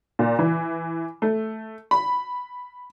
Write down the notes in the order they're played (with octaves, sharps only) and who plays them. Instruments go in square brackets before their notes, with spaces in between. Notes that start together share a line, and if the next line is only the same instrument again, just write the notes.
[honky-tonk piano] A#2
E3
A3
B5